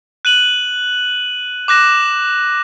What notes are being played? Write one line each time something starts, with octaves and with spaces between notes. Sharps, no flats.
F#6 D#7 F#7
D6 F#6 A#6 E7